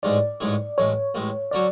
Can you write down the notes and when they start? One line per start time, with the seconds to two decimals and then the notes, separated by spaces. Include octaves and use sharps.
0.03 A1 G#2 G#3 C#4 G#4 D5
0.40 A1 G#2 G#3 C#4 G#4
0.78 A1 A2 G#3 C#5
1.15 A1 A2 G#3
1.51 D3 F#3 C#4 F#4 D5